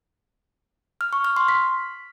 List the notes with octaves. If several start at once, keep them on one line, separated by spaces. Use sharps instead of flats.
F6
C#6
F6
C6
B6